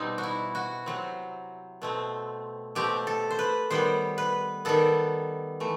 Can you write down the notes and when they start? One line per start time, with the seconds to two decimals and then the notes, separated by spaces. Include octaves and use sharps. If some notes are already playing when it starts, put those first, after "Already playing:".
Already playing: B2 G3 C4 D#4
0.18 F#4
0.23 E4
0.55 F#4
0.86 C3 F#3 C4
1.82 B2 A3 C4
2.75 B2 A3 C4 G4
3.07 A4
3.31 C5
3.39 B4
3.70 D#3 G3 B3 C5
4.18 B4
4.65 D#3 G3 B3 A4
5.60 E3 A3